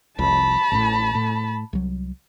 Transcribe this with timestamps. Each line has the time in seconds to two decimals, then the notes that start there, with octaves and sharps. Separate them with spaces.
0.18 F1 C2 F2 A5 B5
0.72 A1 A2
1.15 A2
1.73 C2 F#3